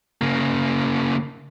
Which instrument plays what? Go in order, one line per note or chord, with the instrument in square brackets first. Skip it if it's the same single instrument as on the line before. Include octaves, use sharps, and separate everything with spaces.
[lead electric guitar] C#3 A#3